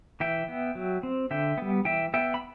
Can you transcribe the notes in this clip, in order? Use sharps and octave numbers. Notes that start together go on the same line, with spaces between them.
E3 E5 G5
B3
F#3
C4
D3 E5 G5
G3 B3
E3 E5 G5
B3 E5 G5
B5